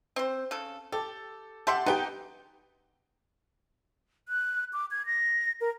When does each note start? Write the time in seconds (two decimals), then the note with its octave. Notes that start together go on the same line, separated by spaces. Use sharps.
0.16 C4 C5
0.51 C#3 A4
0.92 G4 A4
1.67 G4 E5 F#5 A5 C6 G6
1.86 B3 D#4 G4 G5
4.29 F#6
4.73 D6
4.91 G#6
5.06 A#6
5.61 A#4